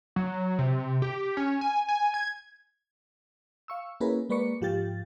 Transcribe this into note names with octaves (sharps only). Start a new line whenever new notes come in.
F#3
C3
G4
C#4
G#5
G#5
G#6
F5 C#6 E6
A#3 C#4 E4 G#4 A#4 B4
G#3 A#3 B4 D5 C#6 C#7
G#2 F3 F4 G4 G5 A6